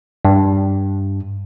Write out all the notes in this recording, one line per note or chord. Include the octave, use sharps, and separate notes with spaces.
G2